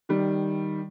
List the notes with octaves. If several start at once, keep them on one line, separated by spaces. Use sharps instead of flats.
D#3 G3